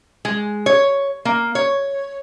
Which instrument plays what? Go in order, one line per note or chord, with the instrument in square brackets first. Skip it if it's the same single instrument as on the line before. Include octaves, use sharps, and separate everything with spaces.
[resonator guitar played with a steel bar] G#3
C#5
A#3
C#5